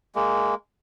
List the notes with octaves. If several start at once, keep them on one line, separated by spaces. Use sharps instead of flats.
G#3 A#3